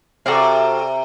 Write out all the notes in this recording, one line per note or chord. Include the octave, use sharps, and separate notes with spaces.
C3 F#4 A4 D5 F5